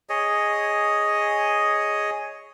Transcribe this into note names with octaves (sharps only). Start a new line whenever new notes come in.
G#4 C#5 D#5